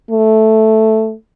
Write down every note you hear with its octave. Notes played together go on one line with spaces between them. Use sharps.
A3